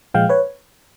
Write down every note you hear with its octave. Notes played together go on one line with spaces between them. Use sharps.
A#2 F3 G#3 F5 G5
B4 C#5